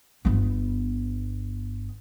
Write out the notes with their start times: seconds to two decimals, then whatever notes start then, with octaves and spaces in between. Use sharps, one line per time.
0.25 G1 B3